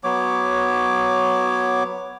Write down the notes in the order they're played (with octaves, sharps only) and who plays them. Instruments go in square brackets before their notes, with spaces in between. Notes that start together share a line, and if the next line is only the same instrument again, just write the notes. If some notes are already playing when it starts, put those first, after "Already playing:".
[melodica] F#3 B3 C#5 D6